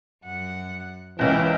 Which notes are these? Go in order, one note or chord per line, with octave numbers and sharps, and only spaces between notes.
F#2 F#5
F#1 C#2 C#3 E3 E5 G5